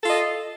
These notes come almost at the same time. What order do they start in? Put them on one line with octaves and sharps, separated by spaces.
A4 F4 D#5